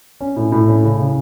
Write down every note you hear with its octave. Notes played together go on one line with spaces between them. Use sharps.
C#4
A2
A2
C#4
C#3
C#3